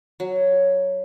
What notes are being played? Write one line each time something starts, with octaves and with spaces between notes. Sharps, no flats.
F#3